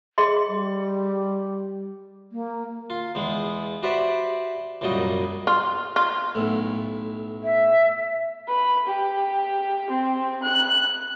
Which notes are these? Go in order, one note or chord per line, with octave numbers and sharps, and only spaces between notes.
G#4 D#5 C6
G3
A#3
F4
E2 G#3 B3
F#4 G4 B4 C5 D5 E5
C2 F#2 A#2 G3 F#4 D#5
F4
F4
B1 A2
E5
B4
G4
C4
F#6